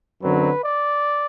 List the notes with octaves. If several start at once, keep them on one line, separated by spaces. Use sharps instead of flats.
F#2 D3 F#3 C4 B4
D5